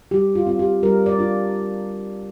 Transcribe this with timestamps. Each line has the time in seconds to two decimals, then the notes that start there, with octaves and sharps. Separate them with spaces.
0.11 G3 G4
0.35 F4
0.47 C4 F4
0.59 G4
0.83 G3 A#4
1.06 D5
1.19 D4 F4